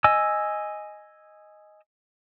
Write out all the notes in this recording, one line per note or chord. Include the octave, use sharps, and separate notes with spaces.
D#5 G#5 E6